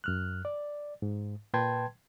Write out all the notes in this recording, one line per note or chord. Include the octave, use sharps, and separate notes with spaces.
F#2 F6 F#6
D5
G#2
A#2 B4 G5 A5 C6 G#6